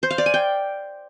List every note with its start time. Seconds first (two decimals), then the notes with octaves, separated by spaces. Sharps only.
0.03 C5
0.11 F5
0.18 D5
0.26 G#5
0.34 G5